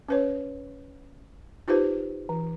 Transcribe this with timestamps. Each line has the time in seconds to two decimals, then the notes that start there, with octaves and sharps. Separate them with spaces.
0.09 C#4 B4 C#5
1.68 D#4 F4 G4 B4 C5
2.29 E3